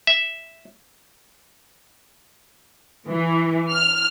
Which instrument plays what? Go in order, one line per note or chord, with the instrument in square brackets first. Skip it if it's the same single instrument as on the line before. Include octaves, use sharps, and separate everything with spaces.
[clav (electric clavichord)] E5
[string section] E3
F6